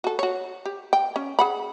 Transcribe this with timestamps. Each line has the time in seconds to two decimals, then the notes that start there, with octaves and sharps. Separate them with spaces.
0.04 F#4 A4
0.19 F#4 C#5
0.65 G4
0.93 G5
1.16 C#4
1.39 G#4 F#5 B5